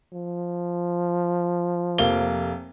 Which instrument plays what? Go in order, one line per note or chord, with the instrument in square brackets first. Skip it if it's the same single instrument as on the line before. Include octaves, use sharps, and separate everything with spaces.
[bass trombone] F3
[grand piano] F1 A#3 G7